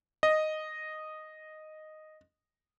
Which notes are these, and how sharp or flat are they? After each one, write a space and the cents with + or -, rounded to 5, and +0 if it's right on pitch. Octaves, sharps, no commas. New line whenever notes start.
D#5 -5